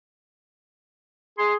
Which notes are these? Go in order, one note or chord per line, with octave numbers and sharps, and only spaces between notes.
G#4 C6